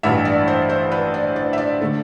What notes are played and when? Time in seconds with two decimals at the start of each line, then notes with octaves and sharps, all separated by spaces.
0.03 A1 G2 E3 G3 E5
0.25 D5
0.47 C5
0.69 C5
0.92 B4
1.14 D5
1.36 D5
1.53 E5
1.58 D5
1.81 D3 A3